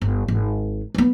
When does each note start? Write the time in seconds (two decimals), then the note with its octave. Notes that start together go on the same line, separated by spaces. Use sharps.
0.02 G1
0.28 G#1
0.95 F#3 B3